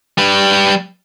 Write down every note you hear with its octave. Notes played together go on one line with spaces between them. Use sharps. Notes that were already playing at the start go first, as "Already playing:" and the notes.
G3 B4